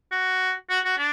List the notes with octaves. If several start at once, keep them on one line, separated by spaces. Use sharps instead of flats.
F#4
F#4
F#4
D4